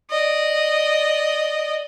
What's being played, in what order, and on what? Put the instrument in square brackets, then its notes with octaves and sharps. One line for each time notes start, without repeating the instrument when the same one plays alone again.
[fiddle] D5 D#5